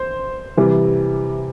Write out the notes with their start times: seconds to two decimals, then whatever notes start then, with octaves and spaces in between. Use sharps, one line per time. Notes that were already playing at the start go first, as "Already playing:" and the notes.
Already playing: C5
0.57 C3 E3 G3